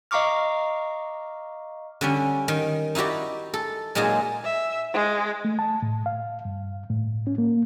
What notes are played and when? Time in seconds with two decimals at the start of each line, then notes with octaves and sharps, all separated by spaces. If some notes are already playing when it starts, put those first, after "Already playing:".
0.11 D#5 F5 A#5 C#6 D6 F6
2.01 D3 G3 C#4
2.48 D#3 G5
2.95 D#4 E4 F#4 G4 D5
3.54 A4
3.95 A#2 F#3 G#3 D#4 F4 G#4
4.45 E5
4.94 G#3
5.45 A3
5.59 A5
5.82 A2
6.06 F5
6.45 G2
6.90 A2
7.27 C#4
7.38 A#3